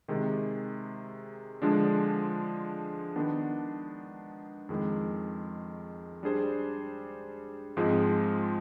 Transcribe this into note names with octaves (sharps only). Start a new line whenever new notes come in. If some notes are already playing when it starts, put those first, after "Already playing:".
C3 D#3 G#3
D3 F3 G#3 D4
D#3 B3 D4
F2 D#3 G#3
G3 D4 G#4 C5
G#2 F3 G#3 C4